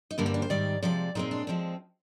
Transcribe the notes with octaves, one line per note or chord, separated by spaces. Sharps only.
D#4
G2 D3 G3 A#3 D4
C4
D4
C5
G#2 D#3 G3 D5
C3 F3 G#3 D5
A#2 G#3 C4 D#4
D4
F3 G#3 C4